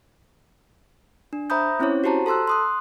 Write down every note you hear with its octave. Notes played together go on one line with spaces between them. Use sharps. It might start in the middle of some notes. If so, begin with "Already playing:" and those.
D4
C5 E5 A#5 B5 D#6 G6
C4 C#4 E4 C5 C#5
F#4 G4 C5 A5 A#5
A4 A5 C6 E6 F#6
C6 D#6 F#6